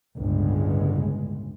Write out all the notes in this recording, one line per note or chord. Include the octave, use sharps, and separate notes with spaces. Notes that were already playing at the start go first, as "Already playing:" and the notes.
G1 C#2 A2 G#3